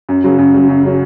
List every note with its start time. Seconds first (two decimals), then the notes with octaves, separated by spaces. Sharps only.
0.09 F#2
0.24 C#3 F#3
0.38 F#2
0.53 C#3 F#3
0.69 F#2
0.83 C#3 F#3